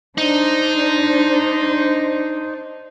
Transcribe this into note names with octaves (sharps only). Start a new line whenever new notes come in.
D4 D#4 C5